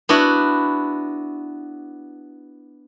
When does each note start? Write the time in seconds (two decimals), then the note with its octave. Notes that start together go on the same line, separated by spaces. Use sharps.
0.09 B3 D4 E4 F#4